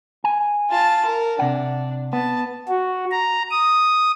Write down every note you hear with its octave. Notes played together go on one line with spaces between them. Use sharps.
G#5
F4 A5
A#4
C3 D4 F#5
B3 A5
F#4
A#5
D#6